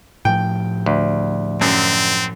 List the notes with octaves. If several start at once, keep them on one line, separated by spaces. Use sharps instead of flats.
A2 F3 G5
D2
F#2 C4